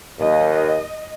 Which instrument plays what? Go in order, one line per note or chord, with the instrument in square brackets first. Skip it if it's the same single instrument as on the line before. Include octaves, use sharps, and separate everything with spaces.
[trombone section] D#2 [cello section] D#5